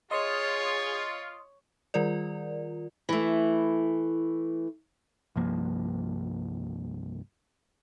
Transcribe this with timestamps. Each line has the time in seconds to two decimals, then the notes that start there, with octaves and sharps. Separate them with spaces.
0.11 F4 G#4 C#5 D#5 C6 D#6
1.94 D#3 G3 F4 A#4 D5
3.09 E3 A3
5.36 C2 G2 F3 A#3